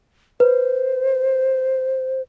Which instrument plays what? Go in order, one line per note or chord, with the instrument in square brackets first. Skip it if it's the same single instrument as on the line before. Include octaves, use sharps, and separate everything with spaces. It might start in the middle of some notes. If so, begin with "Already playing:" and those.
[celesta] B4 [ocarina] C5